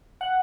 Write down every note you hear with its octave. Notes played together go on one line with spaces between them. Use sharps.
F#5